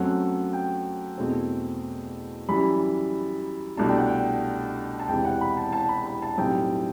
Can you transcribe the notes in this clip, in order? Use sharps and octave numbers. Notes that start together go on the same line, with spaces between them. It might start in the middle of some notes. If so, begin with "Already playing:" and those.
Already playing: F#2 F#3 A3 C4 F#5
G5
E2 B2 A3 C4
F#2 E3 G3 B5
C2 B2 A3 D4 A5
G5
F#5
G5
A5
E1 E2 C3 E3 G5
F#5
B5
A5
A5
B5
B5
A5
B1 A2 G3 C4 G5